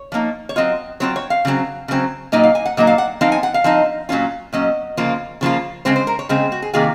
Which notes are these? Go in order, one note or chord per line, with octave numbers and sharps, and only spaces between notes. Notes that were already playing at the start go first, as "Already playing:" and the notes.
Already playing: C#5
F3 A#3 D#4
C#5
F#3 C4 F4 D#5
F#3 C4 F4 C#5
C#5
F5
C#3 F#3 C4
C#3 F#3 C4
A#2 F#3 A#3 D#4 D#5
F5
G#5
F#5
A#2 F#3 A#3 D#4 D#5
F5
F#5
F3 C4 D#4 F5
G#5
F#5
F5
F3 C4 D#4
A#2 F#3 C#4 F4
A#2 F#3 C#4 D#5
C#3 F3 A#3 F4
C#3 F3 A#3 F4
C#3 G#3 C4 C5
C5
A#4
C#5
C#3 G#3 C4
F#4
G#4
C3 D#3 A#3 F4 G#4